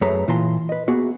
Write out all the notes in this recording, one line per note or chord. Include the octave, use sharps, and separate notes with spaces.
F#2 A3 G#4 B4 C#5 A#5
A#2 E3 F4 A5 A#5 C6
B4 D#5
A#3 B3 F#4 G#4 E5